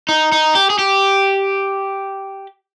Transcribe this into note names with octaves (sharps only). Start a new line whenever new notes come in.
D#4
D#4
G4
G#4
G4